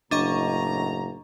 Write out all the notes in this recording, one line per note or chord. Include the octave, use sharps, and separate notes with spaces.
F#1 A2 D4 D#5 A#5 C#6